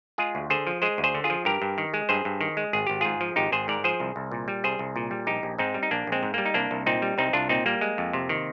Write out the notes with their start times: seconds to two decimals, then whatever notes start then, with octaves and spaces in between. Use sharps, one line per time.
0.18 G#3 F4 G#4
0.35 D2
0.50 D3 G#4 C5
0.67 F3
0.82 G#3 G#4 C5
0.98 D2
1.04 G#4 C5
1.15 D3
1.24 F4 G#4
1.30 F3
1.45 G2 G4 A#4
1.62 G2
1.78 D#3
1.94 G#3
2.09 G2 G#4 C5
2.25 G2
2.41 D#3
2.57 G#3
2.73 G#1 G#4
2.87 G#1 G4
3.01 G#2 F4 G#4
3.21 F3
3.36 G#1 D#4 G4
3.52 G#1 G#4 C5
3.68 G#2 A#4 D5
3.84 F3 G#4 C5
4.00 C2
4.16 C2
4.32 A#2
4.48 G3
4.64 C2 G#4 C5
4.79 C2
4.96 A#2
5.11 G3
5.27 A#1 D#4 G4
5.43 A#1
5.58 G#2 C4 D#4
5.74 G3
5.83 D#4
5.91 A#1 A#3 D4
6.07 A#1 G#3 C4
6.23 G#2
6.34 G3 A#3
6.45 D#4
6.54 C2 A#3 D4
6.71 C2
6.86 A#2 C4 D#4
7.02 G3
7.18 C2 C4 D#4
7.33 C2 D4 F4
7.49 A#2 C4 D#4
7.66 G3 A#3
7.81 G#3
7.98 F2
8.13 C3
8.29 D#3